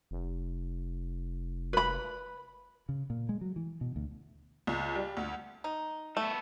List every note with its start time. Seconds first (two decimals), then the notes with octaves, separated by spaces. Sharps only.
0.11 F1
1.73 B4 B5
2.89 C#3
3.10 A#2
3.29 G#3
3.41 F#3
3.56 E3
3.81 B2
3.96 D2
4.67 C#2
4.95 G3
5.17 D2
5.64 D#4
6.17 A3 B3 A4